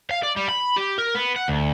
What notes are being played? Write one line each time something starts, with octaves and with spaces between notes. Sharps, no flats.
F5
D5
G3
B5
G4
A#4
B3
F#5
D2